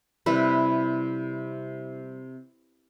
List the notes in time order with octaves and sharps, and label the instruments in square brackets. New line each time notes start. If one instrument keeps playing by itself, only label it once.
[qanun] C3 G3 E4 B4